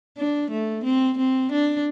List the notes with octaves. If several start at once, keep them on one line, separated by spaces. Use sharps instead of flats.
D4
A3
C4
C4
D4